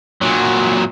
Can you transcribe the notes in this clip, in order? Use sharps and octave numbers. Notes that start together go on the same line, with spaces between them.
A#2 F#3